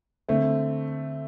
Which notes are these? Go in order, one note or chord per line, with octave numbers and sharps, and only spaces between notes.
D3 A3 C4